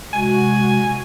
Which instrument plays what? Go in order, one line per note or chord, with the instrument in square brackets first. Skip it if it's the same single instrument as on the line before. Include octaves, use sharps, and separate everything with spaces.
[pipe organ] C3 G#3 [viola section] F#4 [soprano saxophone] G#5